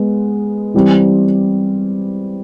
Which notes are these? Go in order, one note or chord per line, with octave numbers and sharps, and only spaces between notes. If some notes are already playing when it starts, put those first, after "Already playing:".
Already playing: G#3 B3
E3 G3 C4